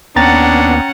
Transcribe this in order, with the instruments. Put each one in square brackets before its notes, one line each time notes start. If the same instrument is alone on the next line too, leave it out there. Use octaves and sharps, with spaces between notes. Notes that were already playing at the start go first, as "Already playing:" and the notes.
[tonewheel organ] D#2 B3 [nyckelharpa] C#4 F#5 [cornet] D4 [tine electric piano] G5 A#5 A6